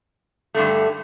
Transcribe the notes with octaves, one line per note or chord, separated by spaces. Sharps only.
G2 D3 A3